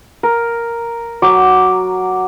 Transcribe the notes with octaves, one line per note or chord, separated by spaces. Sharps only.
A#4
F#3 D6